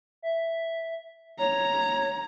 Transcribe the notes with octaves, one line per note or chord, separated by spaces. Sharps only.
E5
C#5 A#5